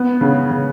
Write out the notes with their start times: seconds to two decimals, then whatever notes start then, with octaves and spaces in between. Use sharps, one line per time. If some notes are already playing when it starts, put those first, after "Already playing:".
Already playing: B3
0.21 C#3
0.51 C#3